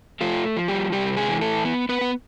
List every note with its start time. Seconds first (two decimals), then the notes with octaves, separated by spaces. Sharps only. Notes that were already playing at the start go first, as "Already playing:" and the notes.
0.21 F3 A3 F4
0.57 F3
0.68 G3 G4
0.92 C3 G3 G4
1.16 G#3 G#4
1.29 E3
1.41 A3 A4
1.65 B3
1.89 B3 B4
2.01 B3